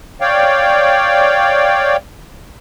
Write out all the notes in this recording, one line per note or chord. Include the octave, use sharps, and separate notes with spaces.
C#5 D5 F5 G5